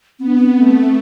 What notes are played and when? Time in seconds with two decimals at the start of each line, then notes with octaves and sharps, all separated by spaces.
0.19 B3 C4
0.27 D4
0.38 C4
0.56 A3